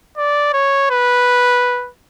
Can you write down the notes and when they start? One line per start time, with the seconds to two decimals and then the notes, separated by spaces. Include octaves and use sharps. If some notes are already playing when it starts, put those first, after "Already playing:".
0.17 D5
0.53 C#5
0.90 B4